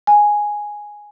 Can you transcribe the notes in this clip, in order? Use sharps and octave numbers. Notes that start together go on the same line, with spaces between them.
G#5